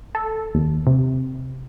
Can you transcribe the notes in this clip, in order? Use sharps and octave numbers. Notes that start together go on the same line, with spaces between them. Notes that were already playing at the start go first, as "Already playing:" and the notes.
A4
D#2
C3